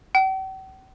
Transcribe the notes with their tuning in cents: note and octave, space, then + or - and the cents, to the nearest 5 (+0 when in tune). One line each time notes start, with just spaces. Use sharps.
G5 -45